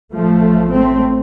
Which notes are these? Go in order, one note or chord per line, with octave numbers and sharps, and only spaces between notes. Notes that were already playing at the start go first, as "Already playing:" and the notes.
A1 A2 F3 A3
A3 C4